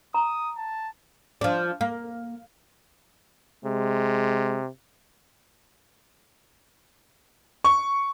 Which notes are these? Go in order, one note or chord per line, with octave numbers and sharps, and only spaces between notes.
A#5 D#6
A5
F3 D4
A#3
C3 G#3
C#6